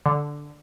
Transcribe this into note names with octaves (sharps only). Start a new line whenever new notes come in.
D3